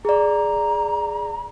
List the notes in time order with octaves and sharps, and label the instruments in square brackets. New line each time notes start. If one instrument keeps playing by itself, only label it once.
[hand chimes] G#4 D5 [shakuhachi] A#5